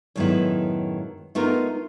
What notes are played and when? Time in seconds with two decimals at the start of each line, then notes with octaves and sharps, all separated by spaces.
0.16 F#2 A2 D#3 G#3 B3 E4
1.35 A3 B3 D#4 F4 A#4